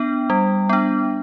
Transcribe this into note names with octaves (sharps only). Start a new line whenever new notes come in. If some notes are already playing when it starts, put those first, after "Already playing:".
Already playing: B3 D4 G5
G3
B3 D4